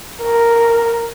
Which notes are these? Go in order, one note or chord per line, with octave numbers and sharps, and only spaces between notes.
A#4